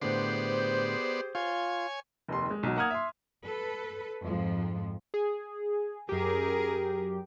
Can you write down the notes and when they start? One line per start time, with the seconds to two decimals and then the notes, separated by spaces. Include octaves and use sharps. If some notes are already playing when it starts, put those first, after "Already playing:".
0.02 A2 D3 B3 G4 G#4 C5 D5 C6
1.35 F4 C#5 G#5
2.28 F1 D#2 C6
2.51 G#3
2.63 B1 F#3
2.77 A#3 F#5 D#6 F6 G#6
2.91 E5 C6
3.44 A4 B4
4.23 F2 G#2 F3
5.14 G#4
6.09 F#2 G4 G#4 A#4